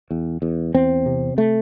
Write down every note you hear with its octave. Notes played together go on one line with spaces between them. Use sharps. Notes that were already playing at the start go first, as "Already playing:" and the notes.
E2
E2
E2 C4
C3
A3